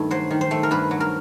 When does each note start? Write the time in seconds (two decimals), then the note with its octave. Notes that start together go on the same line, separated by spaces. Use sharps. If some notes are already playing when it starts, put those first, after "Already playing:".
Already playing: G2 D#3 A3
0.11 F#3 C5
0.31 D#3
0.41 C5
0.51 A3
0.63 A#4
0.71 G2 B4
0.91 F#3
1.00 A#4